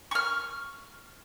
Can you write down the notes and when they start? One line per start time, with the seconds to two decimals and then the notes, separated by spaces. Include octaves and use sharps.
0.11 C#6 F6